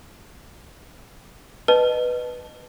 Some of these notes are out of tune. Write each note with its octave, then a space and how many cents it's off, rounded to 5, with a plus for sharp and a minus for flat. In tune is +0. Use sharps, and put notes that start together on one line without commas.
B4 +0 D#5 -25 A5 -10